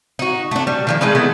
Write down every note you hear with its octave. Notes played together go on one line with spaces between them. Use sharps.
D#4 F#4
A3 D4
G3
D#3 F3 A#3
G#3 A3 D#4 B4
E3 A3 B3